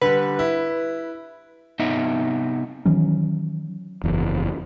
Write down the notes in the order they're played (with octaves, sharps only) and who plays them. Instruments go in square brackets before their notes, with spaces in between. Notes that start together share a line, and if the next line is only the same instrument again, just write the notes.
[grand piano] D3 G3 [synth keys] B4
[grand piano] E4
[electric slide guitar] C3 B3 D#4 D#5 E5
[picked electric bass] D#3 E3 F#3 C#4
[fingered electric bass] F#1 E2